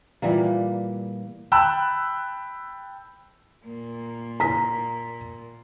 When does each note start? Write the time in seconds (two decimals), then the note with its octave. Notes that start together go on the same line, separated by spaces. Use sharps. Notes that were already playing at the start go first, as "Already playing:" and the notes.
0.22 A#2 E3 G3 A#3
1.52 G5 A5 B5 E6 F#6
3.66 A#2 A#3
4.40 A#5 B6